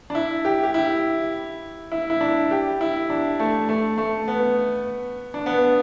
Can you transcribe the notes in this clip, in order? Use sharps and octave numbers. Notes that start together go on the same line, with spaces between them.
D4
E4
G4
G4
E4
E4
E4
D4
G4
E4
D4
A3
A3
A3
B3
D4
B3